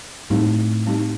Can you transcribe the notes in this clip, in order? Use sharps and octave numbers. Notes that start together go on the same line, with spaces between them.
A2 G3 C4 D#4 G4
G3 C4 D#4 G4